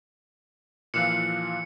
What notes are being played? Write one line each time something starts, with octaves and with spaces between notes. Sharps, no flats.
A#2 E3 F3 F5 E6 F#6 C#7